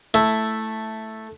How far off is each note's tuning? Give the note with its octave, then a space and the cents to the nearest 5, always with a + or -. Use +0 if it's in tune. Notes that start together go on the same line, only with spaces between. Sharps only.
A3 +0 E4 +0